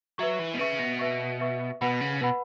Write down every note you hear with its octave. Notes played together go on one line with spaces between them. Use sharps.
F#3 B4 E5 C#6
E3
B2
C#3 B4 E5 C#6
B2
B4 E5 C#6
B4 E5 C#6
B2 B4 F#5 B5
C#3
B2 B4 F#5 B5